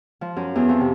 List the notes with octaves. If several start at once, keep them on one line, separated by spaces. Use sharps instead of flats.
F3
F#2
E2
F2
C3